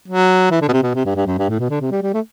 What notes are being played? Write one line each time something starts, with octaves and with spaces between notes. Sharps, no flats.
F#3
E3
D3
B2
C3
B2
C3
G2
G2
F#2
G2
A2
B2
D3
C3
G3
G3
A3